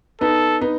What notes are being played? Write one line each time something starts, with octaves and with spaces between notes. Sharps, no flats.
B3 D#4 A4
B3 D#4